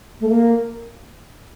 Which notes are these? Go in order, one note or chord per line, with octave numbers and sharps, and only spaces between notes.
A3
A#3